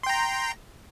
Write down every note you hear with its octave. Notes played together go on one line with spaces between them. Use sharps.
G5 A#5 C6